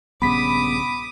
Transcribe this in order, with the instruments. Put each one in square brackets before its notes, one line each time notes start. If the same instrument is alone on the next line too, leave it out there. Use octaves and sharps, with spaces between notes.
[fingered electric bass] A#1 G2 C#3 [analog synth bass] B3 [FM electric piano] B5 B6 [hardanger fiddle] D6 D#6